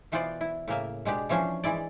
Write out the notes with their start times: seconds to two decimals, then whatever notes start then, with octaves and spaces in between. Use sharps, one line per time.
0.12 B2 E3 B3 F4 C5 D5
0.41 E4
0.68 A2 C#3 A#3 E5
1.05 B2 G#3 D4 G4
1.29 E3 F3 C#4 D4 C5
1.64 E3 G#3 E4 D5